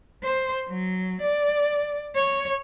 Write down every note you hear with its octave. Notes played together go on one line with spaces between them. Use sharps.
C5
F#3
D5
C#5